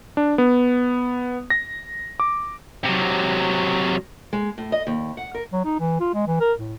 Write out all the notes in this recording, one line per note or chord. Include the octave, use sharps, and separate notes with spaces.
D4
B3
A#6
D6
C3 F#3
G#3
A2
D#5
D#2
F#5
A#4
F#3
D#4
E3
F4
G#3
E3
A#4
A2